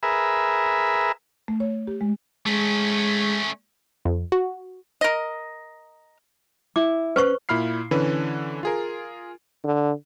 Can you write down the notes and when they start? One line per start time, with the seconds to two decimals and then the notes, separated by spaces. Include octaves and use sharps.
0.03 G#4 A#4 B4 E5
1.48 A3
1.60 C#5
1.87 G4
2.01 G#3
2.46 G#3 A3 C#4
4.05 F2
4.32 F#4
5.01 A#4 D#5
6.76 E4 D6
7.16 C#4 B4 C5 C#6
7.49 A#2 E4 B5 F6 C7
7.91 D3 E3 C#4 B4
8.63 F4 G#4 A#4
9.64 D3